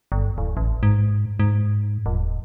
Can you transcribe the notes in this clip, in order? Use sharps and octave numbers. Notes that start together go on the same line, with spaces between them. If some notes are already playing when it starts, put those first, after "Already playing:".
G1
D1
A1
G#2
G#2
D#1